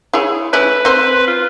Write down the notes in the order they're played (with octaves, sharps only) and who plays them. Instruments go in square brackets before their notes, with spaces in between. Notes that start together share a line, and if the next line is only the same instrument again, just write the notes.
[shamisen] E4 G#4 C#5
[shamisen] A3 C#4 E4 [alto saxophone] B4
[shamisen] C4 C5
[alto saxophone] F4